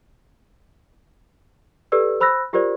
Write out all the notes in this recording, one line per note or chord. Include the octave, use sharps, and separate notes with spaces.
G4 A4 B4 D5 E6
C5 B5 E6 F#6 A#6
F4 G4 A#4 C5 D5